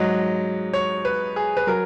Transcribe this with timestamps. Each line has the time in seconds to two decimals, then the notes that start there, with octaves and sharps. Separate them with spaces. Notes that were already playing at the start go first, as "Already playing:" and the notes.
Already playing: G#2 F#3 D#5
0.73 C#5
1.05 B4
1.36 G#4
1.57 B4
1.67 F#3 A#4